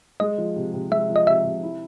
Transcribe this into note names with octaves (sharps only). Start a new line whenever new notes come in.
G#3 D#5
F3
C3
C3
G#3 E5
F3
D#5
C3 E5
C3
E4